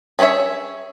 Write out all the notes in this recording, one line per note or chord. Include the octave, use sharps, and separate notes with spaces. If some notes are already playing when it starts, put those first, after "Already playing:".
C#4 G#4 A4 C#5 E5